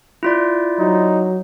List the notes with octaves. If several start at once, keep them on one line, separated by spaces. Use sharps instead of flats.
E4 F4 D5
F#3 D#4